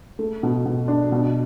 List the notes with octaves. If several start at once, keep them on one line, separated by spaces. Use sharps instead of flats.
A3
B2
B2
D4
B2